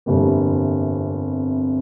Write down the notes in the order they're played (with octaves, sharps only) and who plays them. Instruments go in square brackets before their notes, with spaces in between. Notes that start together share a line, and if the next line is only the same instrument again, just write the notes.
[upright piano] G1 F2 C3 G3 A#3